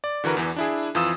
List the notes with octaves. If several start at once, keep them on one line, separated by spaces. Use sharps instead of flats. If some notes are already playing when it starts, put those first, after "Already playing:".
D5
D3 E3 F#4 A#4 B4
E2 E3
D4 E4 G#4
F2 E3 F4 D#6 E6 E7